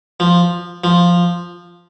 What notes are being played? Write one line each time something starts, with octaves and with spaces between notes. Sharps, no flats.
F3
F3